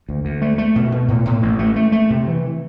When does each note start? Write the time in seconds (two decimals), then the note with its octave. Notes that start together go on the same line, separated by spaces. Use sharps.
0.09 D2
0.25 D2
0.41 A3
0.58 A3
0.76 B2
0.92 B2
1.08 A2
1.25 A2
1.43 A1
1.59 A3
1.76 A3
1.92 A3
2.10 C3
2.27 E3